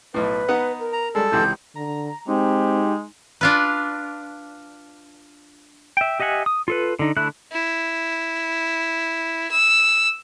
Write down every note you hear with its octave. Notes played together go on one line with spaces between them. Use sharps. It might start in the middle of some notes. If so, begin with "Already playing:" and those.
B1 A2 B4
B3 D#4 F#5
A#4
A#5
G3 G#3 A4
C#2 C3 E3 G6
D3 A#5
G#3 C4 D#4 G4
D4 F4 B4
E5 G5
G4 D#5 E5 F#5 G#5
D#6
F4 A4 B4
D3 D#4
D3 A3 E4 F#6
E4
E6